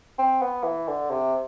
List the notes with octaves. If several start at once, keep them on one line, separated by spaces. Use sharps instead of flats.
C4
B3
E3
D3
C3